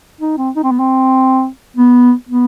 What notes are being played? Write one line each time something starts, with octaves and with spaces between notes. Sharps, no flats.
D#4
C4
D#4
C4
B3
C4
B3
B3